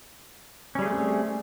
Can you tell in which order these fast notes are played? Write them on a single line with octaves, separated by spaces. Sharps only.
C#4 G3 G#4 A3 C4